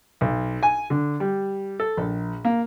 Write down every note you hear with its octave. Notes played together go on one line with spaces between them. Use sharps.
B1
G#5
D3
G3
A4
A#1
A#3